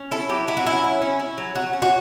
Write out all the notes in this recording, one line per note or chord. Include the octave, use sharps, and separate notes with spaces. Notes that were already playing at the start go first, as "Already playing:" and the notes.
Already playing: C#4
E4 A4
F#3 G4
F#3 E4
F#4
C#4 E4
E4
C#4
E4
F#3
F#3 F#4
C#4
F#4